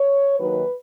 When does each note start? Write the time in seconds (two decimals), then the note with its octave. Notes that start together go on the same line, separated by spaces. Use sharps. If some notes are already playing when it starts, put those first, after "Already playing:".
Already playing: C#5
0.38 D#2 D#3 F#3 B4